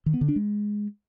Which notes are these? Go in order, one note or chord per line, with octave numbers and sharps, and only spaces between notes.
D#3
B3
D3
D4
G#3